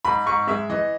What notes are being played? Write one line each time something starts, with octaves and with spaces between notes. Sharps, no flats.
G#2 B5
G#2 C#6
G#3 E5
E3 D#5